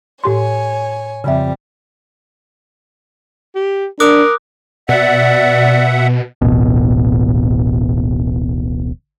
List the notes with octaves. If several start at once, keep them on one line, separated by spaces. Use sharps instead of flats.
A2 G4 C#5 G#5 C6
F2 C#3 G3 E5
G4
D4 A#4 D6 D#6 F#6
B2 D5 E5 F#5
D1 A1 B2